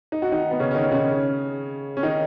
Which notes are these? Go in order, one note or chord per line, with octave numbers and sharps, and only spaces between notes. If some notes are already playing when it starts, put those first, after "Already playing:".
D#4
F#4
D#3 D#4
B3
C#3 C#4
C#4
D#3 D#4
C#3 C#4
C#4
D#3 D#4